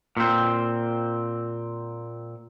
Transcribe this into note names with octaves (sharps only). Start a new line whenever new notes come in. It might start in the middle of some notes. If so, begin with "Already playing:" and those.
A#2 C4